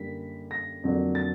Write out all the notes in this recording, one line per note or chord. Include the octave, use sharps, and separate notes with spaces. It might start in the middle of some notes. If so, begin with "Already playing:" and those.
Already playing: F#2 D3 G3 A#3 B6
A#6
F2 D3 F#3 A#3 D4
A6